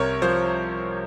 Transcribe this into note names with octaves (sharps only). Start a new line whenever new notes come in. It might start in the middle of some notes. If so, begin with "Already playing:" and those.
Already playing: C2 C3 A#4 C#5
F3 C5